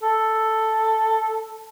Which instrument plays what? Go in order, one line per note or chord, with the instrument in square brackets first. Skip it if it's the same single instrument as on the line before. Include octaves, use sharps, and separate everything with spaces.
[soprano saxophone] A4